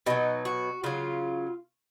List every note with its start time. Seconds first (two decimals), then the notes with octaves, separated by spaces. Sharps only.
0.06 B2 F#3 D#4
0.45 F#4
0.84 C#3 F#3 F4